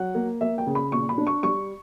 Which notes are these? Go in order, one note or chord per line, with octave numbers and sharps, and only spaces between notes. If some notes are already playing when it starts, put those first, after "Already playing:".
Already playing: F#3 F#5
A#3
A#3 E5
G5
C#3
B5
A#2 C#6
B5
D4
C#6
G3 C#6